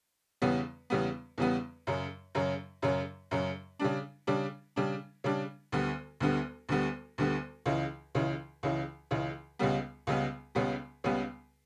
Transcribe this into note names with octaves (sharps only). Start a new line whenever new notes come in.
E2 C#3 G3 B3
E2 C#3 G3 B3
E2 C#3 G3 B3
F#2 C#3 F#3
F#2 C#3 F#3
F#2 C#3 F#3
F#2 C#3 F#3
C#3 G3 D4
C#3 G3 D4
C#3 G3 D4
C#3 G3 D4
D2 D3 G3 B3
D2 D3 G3 B3
D2 D3 G3 B3
D2 D3 G3 B3
C#2 C#3 E3
C#2 C#3 E3
C#2 C#3 E3
C#2 C#3 E3
C#2 C#3 G3 B3
C#2 C#3 G3 B3
C#2 C#3 G3 B3
C#2 C#3 G3 B3